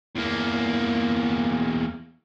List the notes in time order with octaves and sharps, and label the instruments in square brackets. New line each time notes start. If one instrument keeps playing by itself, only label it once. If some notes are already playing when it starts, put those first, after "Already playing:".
[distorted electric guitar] E2 A#3